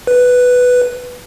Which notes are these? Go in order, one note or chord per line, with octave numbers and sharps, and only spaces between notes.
B4